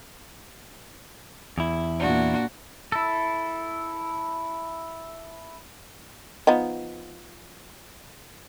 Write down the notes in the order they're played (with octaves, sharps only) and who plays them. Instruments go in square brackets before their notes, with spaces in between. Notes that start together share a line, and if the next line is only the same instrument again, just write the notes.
[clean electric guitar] E2 E4
[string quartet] A#2 D4 F#4
[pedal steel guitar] E4 A4
[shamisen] F3 B3 D#4